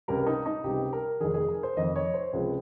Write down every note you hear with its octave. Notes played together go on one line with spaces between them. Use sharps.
C#2 C3 G3 A#4
D#4
D#4
C#2 C3 G3 G4
A#4
F1 F2 D#3 G#4
G#4
A#4
C5
F1 F2 D#3 D#5
C#5
C5
C#2 C3 F3 G#3